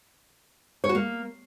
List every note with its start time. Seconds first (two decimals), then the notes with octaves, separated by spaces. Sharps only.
0.84 C#5
0.89 F#4
0.95 A#3